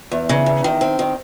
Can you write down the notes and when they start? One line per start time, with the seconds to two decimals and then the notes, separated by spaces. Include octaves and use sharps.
0.12 E2
0.29 C#3
0.46 E2
0.64 D#3
0.81 C4
0.99 D#3